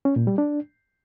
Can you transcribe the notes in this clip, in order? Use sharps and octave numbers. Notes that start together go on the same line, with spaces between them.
C#4
A#2
G3
D4